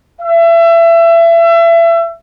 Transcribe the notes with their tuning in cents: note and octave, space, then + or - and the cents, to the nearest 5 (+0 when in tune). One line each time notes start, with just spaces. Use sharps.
E5 +30